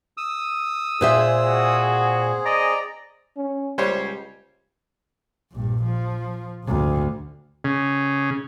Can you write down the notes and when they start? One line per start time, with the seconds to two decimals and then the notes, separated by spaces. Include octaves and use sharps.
0.17 D#6 E6
1.01 A#2 C4 G#4 C5 E5
1.47 F#4
2.45 D5 D#5 A#5
3.37 C#4
3.78 C#2 G3 C5 C#5
5.52 A#1 G2
5.83 F3
6.64 G#1 D2
7.64 C#3